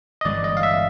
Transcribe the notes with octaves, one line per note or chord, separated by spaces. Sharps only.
D#5
G1 G2 E3 G#3 D5
D#5
F5
E5